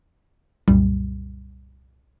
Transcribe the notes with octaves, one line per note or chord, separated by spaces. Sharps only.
C2 F#2 A#2 G3